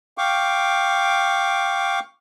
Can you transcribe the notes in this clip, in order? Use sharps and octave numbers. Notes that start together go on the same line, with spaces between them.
F5 G5 C#6 D6